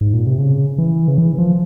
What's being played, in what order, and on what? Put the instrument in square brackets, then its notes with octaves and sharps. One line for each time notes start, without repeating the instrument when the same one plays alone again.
[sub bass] G#2
A#2
C3
C#3
E3
C#3
E3
F3